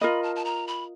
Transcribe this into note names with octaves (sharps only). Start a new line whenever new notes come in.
F4 A#4 D#5 B5
A5
A5
A#5
B5